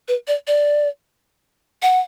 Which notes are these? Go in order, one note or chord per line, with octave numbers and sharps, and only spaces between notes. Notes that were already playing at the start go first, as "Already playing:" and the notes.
B4
D5
D5
F#5